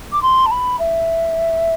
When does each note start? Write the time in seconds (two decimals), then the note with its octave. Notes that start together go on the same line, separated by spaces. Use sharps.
0.12 D6
0.22 C6
0.46 A5
0.51 B5
0.79 E5